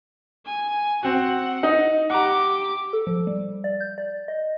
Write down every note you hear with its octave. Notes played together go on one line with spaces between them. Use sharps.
G#5
C4 F#4 F#5
D#4
G4 F#5 A#5 D6
A4
F3
G3
D5
G6
D5
D#5